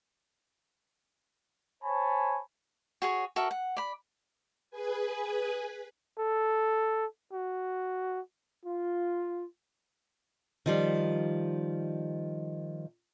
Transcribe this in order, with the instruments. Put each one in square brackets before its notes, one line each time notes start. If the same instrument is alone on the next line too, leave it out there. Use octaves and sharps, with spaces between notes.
[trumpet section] C5 C#5 G#5 A5 B5
[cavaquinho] F#4 G#4 C#5
F#4 A4 A#4 E5
F#5
D5 B5
[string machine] G#4 B4 G#5
[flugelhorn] A4
F#4
[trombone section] F4
[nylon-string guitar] D#3 F3 G3